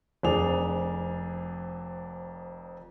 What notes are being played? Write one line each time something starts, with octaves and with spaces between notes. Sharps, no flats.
F1 F2 D4 G#4 F7